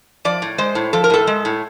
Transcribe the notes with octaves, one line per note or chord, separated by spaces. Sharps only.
F3 D5
A2
G#3 C5
A2
F3 A4
A#4
A2 A4
G#3
A2